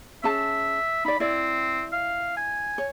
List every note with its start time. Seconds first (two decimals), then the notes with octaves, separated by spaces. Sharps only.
0.24 C#4 G#4 E5 A5
1.05 D#4 D5 B5
1.20 C4 E4 D5
1.92 F5
2.37 G#5
2.78 C#5